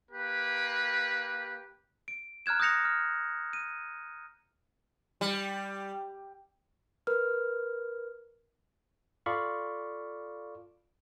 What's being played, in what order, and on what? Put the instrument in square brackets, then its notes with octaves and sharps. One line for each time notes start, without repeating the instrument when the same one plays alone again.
[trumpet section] A#3 G4 B4
[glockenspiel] D7
A#5 F6 F#6 G#6 E7
D#6 F#6 G6 A#6 C#7 F7
F6
D#7
[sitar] G3
[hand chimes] A#4 B4 F6
[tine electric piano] F4 A4 D5 F5 B5 C#6